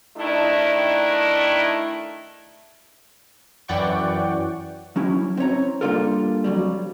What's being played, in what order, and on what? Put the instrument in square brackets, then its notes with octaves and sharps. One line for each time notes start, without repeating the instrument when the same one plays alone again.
[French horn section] D#3 A3 D4 E4
[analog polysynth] F#2 E3 D5 F#5 G5 C#6
[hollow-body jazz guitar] F#3 C#4 E4
C4 E4 C#5 A#5
G3 A#3 D4 F4 A4 A#4
F2 F#3 G3